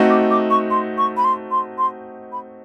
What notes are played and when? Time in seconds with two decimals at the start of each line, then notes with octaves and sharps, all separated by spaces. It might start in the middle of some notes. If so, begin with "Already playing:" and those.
Already playing: A3 C4 D#4 F#4
0.10 D6
0.30 D6
0.50 C#6
0.70 C6
0.98 C#6
1.17 B5
1.24 C6
1.51 C6
1.78 C6
2.32 B5